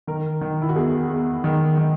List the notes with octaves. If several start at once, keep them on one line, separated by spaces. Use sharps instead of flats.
D#3 A#4
D#3
E4
F#4
E2 G#4
E2
D#3
D#3